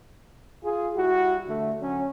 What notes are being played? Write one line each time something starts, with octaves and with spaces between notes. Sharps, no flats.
F4 G#4
G3 E4 F#4
D3 A3
D3 F#3 C#4